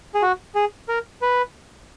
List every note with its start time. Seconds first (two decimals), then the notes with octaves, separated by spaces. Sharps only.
0.14 G#4
0.22 F#4
0.55 G#4
0.89 A#4
1.22 B4